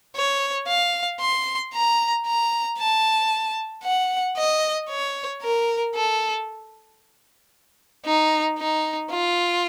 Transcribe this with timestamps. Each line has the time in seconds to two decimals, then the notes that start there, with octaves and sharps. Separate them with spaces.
0.16 C#5
0.68 F5
1.20 C6
1.74 A#5
2.26 A#5
2.79 A5
3.84 F#5
4.37 D#5
4.89 C#5
5.43 A#4
5.95 A4
8.06 D#4
8.58 D#4
9.11 F4